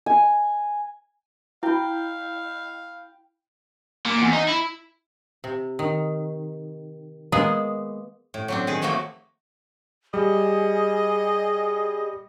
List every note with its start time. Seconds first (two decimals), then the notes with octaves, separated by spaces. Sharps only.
0.06 G#5
1.63 E4 F5 G5 B5
4.06 A#2
4.22 E2
4.33 D#4
4.48 E4
5.44 C3
5.79 D#3
7.32 G#3 A#3 B3 G#4
8.34 A2
8.48 F#3 C4 D4
8.67 D#3 G#4 B4
8.82 C3 F3 F#3 A3 A#3 F#4
10.14 G3 G#4 D#5